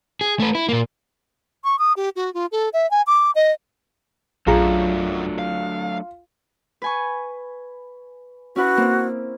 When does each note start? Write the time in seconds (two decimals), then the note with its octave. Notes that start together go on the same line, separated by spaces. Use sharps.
0.21 G#4
0.40 A3 B4
0.55 E4
0.69 A#2 A#3
1.64 C#6
1.79 D#6
1.97 G4
2.16 F#4
2.34 F4
2.52 A4
2.73 E5
2.91 G#5
3.07 D6
3.35 D#5
4.47 A#1 F#2 F#3 A3 D4 F4 G#4 A#5
5.39 F5
6.82 B4 G#5 C#6
8.56 C#4 E4 F#4 B4
8.77 A#3 C4